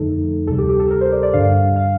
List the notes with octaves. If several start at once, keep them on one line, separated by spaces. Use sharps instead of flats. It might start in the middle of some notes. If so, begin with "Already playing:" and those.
Already playing: F2 D3 F3 A3 D#4 A4
D2 C3 G3 A4
G4
G4
A4
A#4
C5
D5
D5
G2 D3 G3 D4 F5
F5